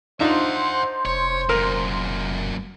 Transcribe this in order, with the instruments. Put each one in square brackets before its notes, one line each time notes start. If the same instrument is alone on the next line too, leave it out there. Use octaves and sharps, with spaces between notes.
[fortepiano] D4 D#4 F4 [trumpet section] C5 [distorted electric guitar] E5 F#5
[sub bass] F1 [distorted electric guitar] C#5
[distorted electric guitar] F#2 A#2 [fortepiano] A#4